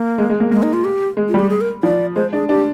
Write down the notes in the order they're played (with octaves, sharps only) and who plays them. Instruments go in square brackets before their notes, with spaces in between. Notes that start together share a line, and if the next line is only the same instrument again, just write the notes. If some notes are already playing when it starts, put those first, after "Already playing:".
Already playing: [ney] A#3
[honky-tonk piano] G#3
G#3
A#3
[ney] G#3 [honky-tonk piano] A#3
[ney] D#4
F4
G4
[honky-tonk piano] G#3
[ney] F4
[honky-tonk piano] G3
[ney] G4
G#4
A#4
[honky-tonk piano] F3 [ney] D5
[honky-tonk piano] G#3 [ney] C5
[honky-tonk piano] D4 [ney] G#4
[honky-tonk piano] D4 [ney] G4